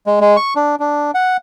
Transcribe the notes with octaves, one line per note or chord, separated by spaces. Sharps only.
G#3
G#3
C#6
D4
D4
F#5